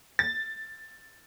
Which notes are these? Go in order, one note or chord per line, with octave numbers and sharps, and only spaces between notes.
A6